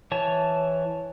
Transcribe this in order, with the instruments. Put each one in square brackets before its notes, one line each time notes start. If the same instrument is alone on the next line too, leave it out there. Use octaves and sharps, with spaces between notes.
[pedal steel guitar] E3 C#5 A5